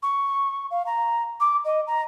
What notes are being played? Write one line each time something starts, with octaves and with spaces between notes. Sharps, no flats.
C#6
F5
A#5
D6
D#5
A#5